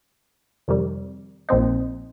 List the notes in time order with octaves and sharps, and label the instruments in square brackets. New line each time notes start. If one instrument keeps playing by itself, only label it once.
[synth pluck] F2 C3 D#3 G3
A#1 A#2 F3 C4 D#4